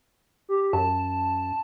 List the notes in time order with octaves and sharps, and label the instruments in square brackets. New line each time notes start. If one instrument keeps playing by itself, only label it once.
[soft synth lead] G4
[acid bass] F#2 [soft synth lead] A5